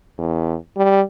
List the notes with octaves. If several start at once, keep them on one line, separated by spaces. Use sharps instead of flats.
E2
G3